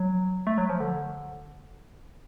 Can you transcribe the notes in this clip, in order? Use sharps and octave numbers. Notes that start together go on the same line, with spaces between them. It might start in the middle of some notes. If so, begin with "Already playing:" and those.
Already playing: F#3
A3
F#3
F3
D3